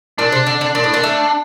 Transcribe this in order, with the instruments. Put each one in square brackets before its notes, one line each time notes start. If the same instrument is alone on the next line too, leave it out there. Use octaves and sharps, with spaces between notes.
[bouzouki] A#2 [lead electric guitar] D4
[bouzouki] C3
D3
D3
[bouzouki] A#2 [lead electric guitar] D4
[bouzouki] A2
A#2
A3